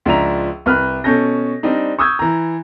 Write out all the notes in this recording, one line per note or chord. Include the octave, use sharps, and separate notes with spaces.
C#2 F3 D4 E5 A#5 F7
C2 B4 F6 F#6
B2 C#4 A4 G6 A#6
G3 C4 D4 D#4
C#6 D#6 E6 G6 G#6
E3 A#5